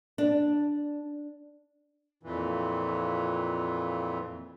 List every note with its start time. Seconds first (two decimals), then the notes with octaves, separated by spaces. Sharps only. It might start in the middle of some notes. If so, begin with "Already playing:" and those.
0.18 D4
2.23 F2 A#2 E3